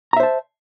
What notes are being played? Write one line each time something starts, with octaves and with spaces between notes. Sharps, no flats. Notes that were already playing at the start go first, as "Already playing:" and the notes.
C5 E5 A5 A#5